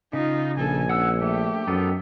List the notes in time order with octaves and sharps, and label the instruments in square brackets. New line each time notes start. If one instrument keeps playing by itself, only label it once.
[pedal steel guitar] C#3 [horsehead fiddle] D#4 F4
[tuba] A#1 [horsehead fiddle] A4 G#5
[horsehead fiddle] C#4 [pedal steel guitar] F#5 E6
[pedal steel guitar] A3 [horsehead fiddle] G4
[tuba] F#2 [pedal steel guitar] B3 D#4 A4